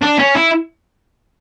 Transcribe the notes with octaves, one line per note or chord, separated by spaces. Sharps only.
D4
C#4
E4